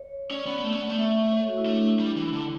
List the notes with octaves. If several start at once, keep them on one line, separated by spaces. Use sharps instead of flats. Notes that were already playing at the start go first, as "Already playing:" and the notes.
Already playing: C#5
C#4 D5
B3
B3
A3
C#4
B3
A3
E5
C#5
A4
F#4
E4
A3 D4
D4
E4
G3
E3
D3 E4